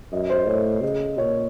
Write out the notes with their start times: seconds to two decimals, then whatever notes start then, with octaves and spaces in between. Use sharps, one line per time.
0.12 F#2 D#5
0.30 C5
0.47 A2 C#5
0.82 C#3 D#5
1.18 A#2 C#5